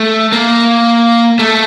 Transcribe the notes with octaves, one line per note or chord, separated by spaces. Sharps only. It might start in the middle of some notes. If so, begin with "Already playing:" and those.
Already playing: A3
A#3
A3